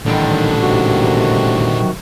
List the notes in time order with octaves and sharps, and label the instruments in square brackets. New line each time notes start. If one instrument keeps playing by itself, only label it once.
[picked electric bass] A1 [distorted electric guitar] A#2 G3 [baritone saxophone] D3 [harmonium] D#3
[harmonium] C3 D#3 F#4